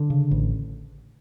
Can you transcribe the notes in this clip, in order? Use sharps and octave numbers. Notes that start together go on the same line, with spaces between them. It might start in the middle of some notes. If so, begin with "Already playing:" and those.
Already playing: D3
C#3
A1